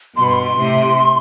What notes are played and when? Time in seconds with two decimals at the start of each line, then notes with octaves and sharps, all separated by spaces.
0.16 G2 B2 C6
0.23 B5
0.30 C6
0.57 A2 C3